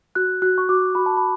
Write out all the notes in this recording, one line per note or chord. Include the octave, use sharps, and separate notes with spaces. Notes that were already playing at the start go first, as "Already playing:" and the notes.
F#4 F#6
F#4 F#6
C#6
F#4 D6
F#4 B5
A5
B5